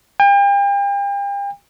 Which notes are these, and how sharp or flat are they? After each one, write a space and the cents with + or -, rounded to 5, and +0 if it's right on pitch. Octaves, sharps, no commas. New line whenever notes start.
G5 +40